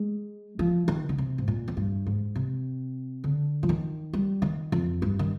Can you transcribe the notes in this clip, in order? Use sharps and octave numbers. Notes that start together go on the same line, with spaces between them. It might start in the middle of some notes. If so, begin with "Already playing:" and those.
Already playing: G#3
F3
D#3
D3
C3
G#2
A#2
F2
G2
G#2
C3
D3
F3
D#3
G3
D#3
F2
G2
D#3